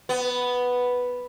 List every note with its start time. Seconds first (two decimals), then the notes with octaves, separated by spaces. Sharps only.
0.09 B3